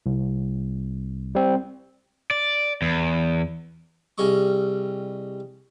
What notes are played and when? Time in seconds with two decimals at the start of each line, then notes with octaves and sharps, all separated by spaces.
0.06 C2
1.35 G3 C4
2.31 D5
2.82 E2
4.18 C2 G3 G#4 D#5 C#6